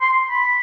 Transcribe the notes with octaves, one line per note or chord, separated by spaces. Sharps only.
C6
B5